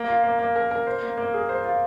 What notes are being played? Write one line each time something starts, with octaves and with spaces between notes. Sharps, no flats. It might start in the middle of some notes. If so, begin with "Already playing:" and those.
Already playing: A#3
F4
A#3
A#3
A#4
A#4
C5
A#3
A#3
G#4
C5
F4